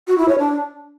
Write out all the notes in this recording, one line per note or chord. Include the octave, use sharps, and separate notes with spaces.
F#4
E4
C#5
D4